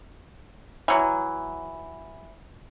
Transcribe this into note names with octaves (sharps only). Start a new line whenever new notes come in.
E3 F#3